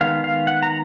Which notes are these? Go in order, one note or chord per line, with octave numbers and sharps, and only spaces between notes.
D#3 G#3 B3 F5
F5
F#5
A#5